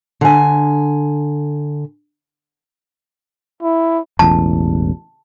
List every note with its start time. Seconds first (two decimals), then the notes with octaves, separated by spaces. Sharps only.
0.21 D3 G#5
3.63 E4
4.19 E1 A1 E2 A5